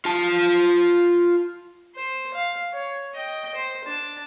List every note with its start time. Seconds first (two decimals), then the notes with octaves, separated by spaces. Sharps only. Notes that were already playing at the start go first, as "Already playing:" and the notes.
0.05 F4 A5
1.95 C5
2.34 F5
2.73 C#5
3.15 D#5 G5
3.55 C5
3.85 D4 A5